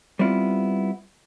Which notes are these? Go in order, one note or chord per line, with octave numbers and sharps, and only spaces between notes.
G3 B3 C4 E4 F4